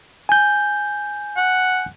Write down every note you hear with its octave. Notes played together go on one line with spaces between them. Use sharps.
G#5 G6
F#5